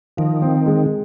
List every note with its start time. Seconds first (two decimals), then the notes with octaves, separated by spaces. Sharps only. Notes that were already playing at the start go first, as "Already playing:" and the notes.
0.17 D#3 F3
0.42 C4
0.66 G#3